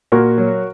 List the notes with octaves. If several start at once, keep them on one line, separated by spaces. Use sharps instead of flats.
A#2 F#4 A#4
F#3